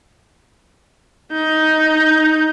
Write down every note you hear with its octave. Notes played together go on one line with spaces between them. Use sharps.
D#4 G6